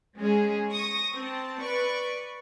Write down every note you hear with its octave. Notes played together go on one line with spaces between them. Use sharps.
G#3 C#4 G#4
C#6 D#6 A#6
C4 A5
B4 D5 C#6